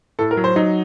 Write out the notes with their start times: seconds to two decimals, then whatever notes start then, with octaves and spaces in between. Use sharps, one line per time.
0.19 A2 A4
0.31 A#4
0.37 F#3
0.44 C5
0.56 F#3 D#4